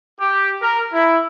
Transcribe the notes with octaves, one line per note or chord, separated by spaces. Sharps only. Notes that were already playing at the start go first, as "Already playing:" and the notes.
G4
A#4
E4